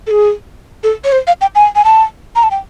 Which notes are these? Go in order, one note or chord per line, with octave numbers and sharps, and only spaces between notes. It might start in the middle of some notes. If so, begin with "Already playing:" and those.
A4
G#4
A4
C#5
C5
F5
G5
G#5
G#5
A5
A#5
A5
G5